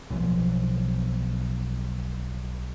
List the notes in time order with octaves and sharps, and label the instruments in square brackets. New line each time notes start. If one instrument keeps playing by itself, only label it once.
[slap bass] B1 F3